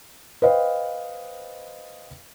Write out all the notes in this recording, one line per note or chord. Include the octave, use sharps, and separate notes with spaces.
B4 C5 D#5 F5 G5